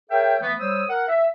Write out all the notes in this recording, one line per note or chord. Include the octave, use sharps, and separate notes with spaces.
G#4 A#4 C#5 E5 G5
E3 A3 B3
G3 C5 C#5 D#6 E6
A#4 F#5
E5